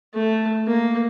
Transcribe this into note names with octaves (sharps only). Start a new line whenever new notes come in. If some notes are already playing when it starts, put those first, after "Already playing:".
A3
A#3